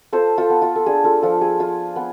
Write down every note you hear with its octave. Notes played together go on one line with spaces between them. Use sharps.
F4 A4 C5
F4 A4
B3
F4
A4
D4 G#4
F4 A4
F3 F4 A4
G#4
F4
B3